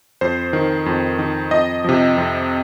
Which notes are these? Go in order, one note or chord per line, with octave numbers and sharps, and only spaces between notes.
F2 C5
D#3
F2
D#3
F2 D#5
C3 F3
F2